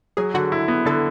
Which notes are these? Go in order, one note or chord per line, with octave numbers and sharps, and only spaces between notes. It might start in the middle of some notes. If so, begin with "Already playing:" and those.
F#3 G#4
D3 F#4
E4
B3
D3 A4